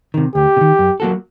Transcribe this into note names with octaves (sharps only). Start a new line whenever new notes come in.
C3 D#3
D2 G4
C3
D#3
F#2
F#3 A#3 F#4 A4